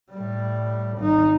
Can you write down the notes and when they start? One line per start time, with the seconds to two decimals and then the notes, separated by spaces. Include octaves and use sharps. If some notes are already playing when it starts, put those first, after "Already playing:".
0.11 A2 G3
0.98 G#1 D#4